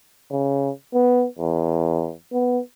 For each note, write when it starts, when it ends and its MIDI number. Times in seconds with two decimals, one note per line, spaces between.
0.31 0.70 49
0.94 1.26 59
1.38 2.13 40
2.32 2.59 59